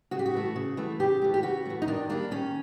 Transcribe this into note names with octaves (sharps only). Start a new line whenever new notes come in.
C#3 F#4
G4
F#4
E3 A3
C#3
E3 A3
C#3 G4
E3 A3
G4
C#3 F#4
E3 A3
D#4
D#3 D4
G3 A#3 D4
D#3 C#4